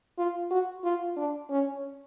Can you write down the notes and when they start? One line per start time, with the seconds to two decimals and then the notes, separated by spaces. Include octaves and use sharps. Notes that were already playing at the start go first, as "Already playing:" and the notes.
0.18 F4
0.51 F#4
0.84 F4
1.17 D4
1.50 C#4